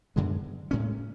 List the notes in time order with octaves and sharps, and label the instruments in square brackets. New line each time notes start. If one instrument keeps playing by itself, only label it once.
[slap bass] F#2 D3 G#3 B3
A2 G#3 C#4